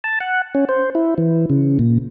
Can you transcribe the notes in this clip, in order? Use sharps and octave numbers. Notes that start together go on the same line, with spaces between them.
A5
F#5
C#4
C5
E4
E3
C#3
A#2